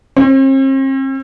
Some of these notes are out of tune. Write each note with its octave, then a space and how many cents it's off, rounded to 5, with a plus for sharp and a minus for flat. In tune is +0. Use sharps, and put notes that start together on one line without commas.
C4 +45